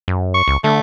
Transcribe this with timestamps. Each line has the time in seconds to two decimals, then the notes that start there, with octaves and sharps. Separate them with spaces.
0.08 F#2
0.34 C#6
0.48 C#2
0.64 D3 A3